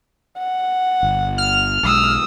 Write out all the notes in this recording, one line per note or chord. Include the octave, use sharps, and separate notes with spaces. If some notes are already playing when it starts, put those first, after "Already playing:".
F#5
G1
F6
B1 G3 G#3 D#6 E6